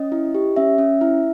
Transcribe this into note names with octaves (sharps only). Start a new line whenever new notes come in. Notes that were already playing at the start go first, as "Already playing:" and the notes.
Already playing: C#4 D#5
E4
G4
C#4 E5
C#4
E4